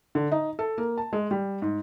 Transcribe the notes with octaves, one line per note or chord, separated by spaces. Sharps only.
D3
D#4
A4
A#3
A5
G#3
G3
G#2